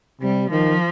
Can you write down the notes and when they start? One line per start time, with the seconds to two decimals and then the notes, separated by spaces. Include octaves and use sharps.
0.21 C3 G3
0.50 D#3 F3